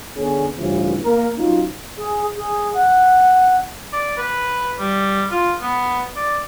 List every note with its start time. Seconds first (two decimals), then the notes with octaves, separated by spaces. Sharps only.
0.17 D3 B3 C#4 G#4
0.56 A1 G2 C#3 E3 F3
1.04 A#3 A#4
1.37 F#3 C#4 D#4 F4
1.97 G#4
2.37 G#4
2.74 F#5
3.93 D5
4.17 B4
4.79 G3
5.31 F4
5.62 B3
6.16 D5